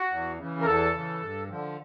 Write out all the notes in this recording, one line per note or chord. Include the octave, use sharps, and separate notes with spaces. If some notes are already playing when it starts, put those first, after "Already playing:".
Already playing: F#4
E2
C#3 E3
A#4
E2 A4
C#3 E3
G2
D3 F3